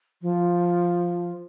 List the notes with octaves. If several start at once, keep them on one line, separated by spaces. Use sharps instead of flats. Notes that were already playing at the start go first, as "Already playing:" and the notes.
F3